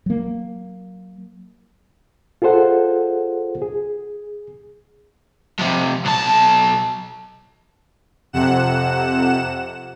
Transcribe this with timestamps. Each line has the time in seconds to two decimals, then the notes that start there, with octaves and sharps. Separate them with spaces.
0.06 F#3 A#3
2.42 F4 G#4 A4 C5 F#5
3.62 G#4
5.59 F2 C3
6.05 B1 A5
8.33 F2 C3 F#5 E7